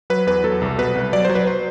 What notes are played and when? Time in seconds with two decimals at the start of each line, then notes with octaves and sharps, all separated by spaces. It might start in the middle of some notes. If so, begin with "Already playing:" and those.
0.10 F#3 B4
0.27 E2 B4
0.44 F#3 A4
0.62 C2
0.78 B2 B4
0.95 C2
1.13 F#3 D5
1.25 F#3 C5
1.35 B4
1.47 C5